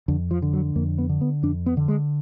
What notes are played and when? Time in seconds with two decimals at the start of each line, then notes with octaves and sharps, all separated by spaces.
0.08 F2 D3
0.31 F3
0.42 D3
0.53 F#3
0.76 F2 A#3
0.98 B3
1.09 D3
1.21 B3
1.43 F2 D4
1.66 B3
1.77 D3
1.88 G#3